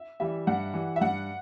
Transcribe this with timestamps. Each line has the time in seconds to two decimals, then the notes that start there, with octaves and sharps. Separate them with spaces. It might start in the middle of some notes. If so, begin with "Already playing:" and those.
Already playing: E5
0.20 E3 G3 E5
0.47 G2 F#5
0.74 E3 G3
0.96 E5
1.01 G2 F#5